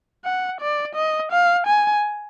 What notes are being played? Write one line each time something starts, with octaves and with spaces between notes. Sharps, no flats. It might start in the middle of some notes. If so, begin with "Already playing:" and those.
F#5
D5
D#5
F5
G#5